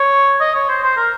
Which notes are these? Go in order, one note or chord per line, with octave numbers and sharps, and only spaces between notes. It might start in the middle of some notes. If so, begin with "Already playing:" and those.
Already playing: C#5
D#5
C#5
C5
C5
A#4